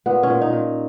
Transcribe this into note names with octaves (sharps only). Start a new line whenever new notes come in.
A#2 B3
C#4
A#2
D#4
A#2